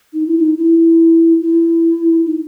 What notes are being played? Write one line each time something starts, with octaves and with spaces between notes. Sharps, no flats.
D#4
E4
D#4
E4
E4
D#4